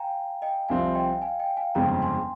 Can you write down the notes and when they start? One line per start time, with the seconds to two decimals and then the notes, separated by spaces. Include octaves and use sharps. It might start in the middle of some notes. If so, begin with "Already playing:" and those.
Already playing: F5 G5 G#5 A#5
0.42 D#5 G5
0.69 C2 C3 F3 C4 F5 G#5
0.95 D#5 G5
1.22 F5 G#5
1.39 D#5 G5
1.57 F5 G#5
1.75 G1 F2 C#3 G#3 C4 G5 A#5
2.02 G#5 C6